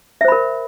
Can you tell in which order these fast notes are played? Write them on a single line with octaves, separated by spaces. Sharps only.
E5 C5 B5 A#4